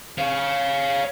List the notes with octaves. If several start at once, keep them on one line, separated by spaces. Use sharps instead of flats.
C#5 F5